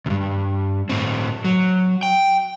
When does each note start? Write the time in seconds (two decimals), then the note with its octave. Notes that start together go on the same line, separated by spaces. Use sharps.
0.06 D2 G2
0.89 A2 C4
1.45 F#3
2.03 G5